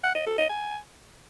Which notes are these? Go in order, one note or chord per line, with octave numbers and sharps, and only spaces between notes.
F#5
D#5
A4
D#5
G#5